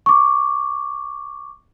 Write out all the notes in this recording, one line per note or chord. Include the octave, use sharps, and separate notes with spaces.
C#6 D6